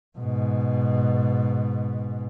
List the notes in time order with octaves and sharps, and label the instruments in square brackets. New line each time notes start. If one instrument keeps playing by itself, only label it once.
[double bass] G#2 B2